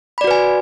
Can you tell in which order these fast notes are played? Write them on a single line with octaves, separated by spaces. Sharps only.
B5 D5 F#4 B4 G#5